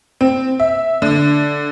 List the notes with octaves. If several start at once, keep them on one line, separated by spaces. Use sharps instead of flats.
C4
E5
D3